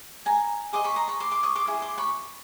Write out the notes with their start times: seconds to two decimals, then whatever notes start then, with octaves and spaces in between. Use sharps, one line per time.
0.26 G#5 A#5
0.73 G#4 C5 D#5 C6 D6
0.84 B5 C#6
0.96 A#5 C6
1.08 B5 C#6
1.20 C6 D6
1.31 C6 D6
1.43 C#6 D#6
1.55 C6 D6
1.67 E4 G#4
1.82 C6 D6
1.98 B5 C#6